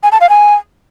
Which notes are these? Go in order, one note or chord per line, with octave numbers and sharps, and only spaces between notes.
G#5
A5
F5
G#5